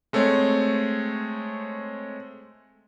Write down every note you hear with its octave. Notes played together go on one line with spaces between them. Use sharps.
G#3 A3 C4 C#5